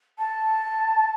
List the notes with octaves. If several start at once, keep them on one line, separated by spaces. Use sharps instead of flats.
A5